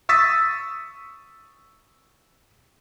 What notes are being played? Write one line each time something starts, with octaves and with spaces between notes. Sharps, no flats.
C#6 D#6 E6 A6 B6